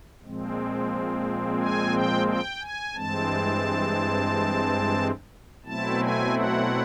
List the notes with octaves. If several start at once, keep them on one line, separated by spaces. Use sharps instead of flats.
A#2 F3 G#3 C4
G#5
G5
G5
G#5
G2 E3 G#3 C4 A5
B2 F#3 A3 C4 E4 A5
G#5
F#5